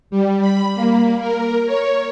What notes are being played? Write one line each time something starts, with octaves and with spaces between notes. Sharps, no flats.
G3
B5
A#3
A#4
C#5